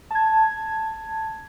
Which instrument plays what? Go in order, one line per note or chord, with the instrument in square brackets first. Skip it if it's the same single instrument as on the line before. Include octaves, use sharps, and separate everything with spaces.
[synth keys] A5 G#6